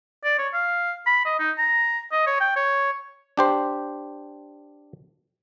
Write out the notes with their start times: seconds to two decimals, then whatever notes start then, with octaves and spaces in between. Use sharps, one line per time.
0.24 D5
0.38 C#5
0.53 F5
1.06 B5
1.25 D#5
1.39 D#4
1.58 A#5
2.11 D#5
2.27 C#5
2.40 G5
2.56 C#5
3.37 D4 G4 C5